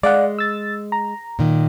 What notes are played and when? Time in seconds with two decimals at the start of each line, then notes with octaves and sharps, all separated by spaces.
0.03 G#3 D5 F5 F#5
0.38 E6 A6
0.92 A#5
1.39 A#2 D#3